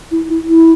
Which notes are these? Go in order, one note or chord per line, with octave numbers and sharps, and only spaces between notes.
E4
E4
E4